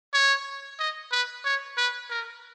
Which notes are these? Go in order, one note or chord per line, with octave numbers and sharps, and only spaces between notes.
C#5
D#5
B4
C#5
B4
A#4